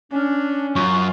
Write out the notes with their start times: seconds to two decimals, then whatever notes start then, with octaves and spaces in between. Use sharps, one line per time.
0.12 C#4 D4
0.76 F#2 F4 C#6